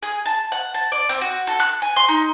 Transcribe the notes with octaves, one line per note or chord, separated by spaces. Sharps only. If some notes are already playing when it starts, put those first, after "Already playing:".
G#4
A5
F#5
A5
D5
C4
F#4
A4
F#6
G#5
C6
D#4